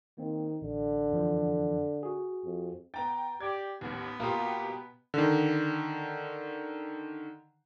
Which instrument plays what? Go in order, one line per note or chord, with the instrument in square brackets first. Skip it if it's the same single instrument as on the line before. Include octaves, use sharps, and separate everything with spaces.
[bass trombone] D#3 [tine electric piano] A#3 C4
[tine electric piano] A1 [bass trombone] D3
[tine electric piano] F2 E3 F3
F#4 G#4
[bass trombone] F2
[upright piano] B3 A#5 A6 [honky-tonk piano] G5
[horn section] G4 D5 [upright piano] G#6
[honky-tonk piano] A1 D#2 [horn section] B3
[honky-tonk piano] B2 G4 [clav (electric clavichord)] A#3 F4 [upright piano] F5 A#5 D#6
[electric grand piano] D3 D#3